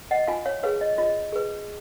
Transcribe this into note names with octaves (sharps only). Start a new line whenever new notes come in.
D#5 F#5
F4 F5 G#5
C#5 F5
G#4 B4 C#5 F5
D#5
F4 D#5
G#4 B4